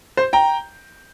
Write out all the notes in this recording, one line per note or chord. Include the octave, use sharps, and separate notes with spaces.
C5
G5 A#5